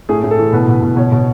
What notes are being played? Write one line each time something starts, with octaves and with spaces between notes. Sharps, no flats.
A2 G#4
A2
A4
E3
B2 B4
B2
B2
B2 C#5
B2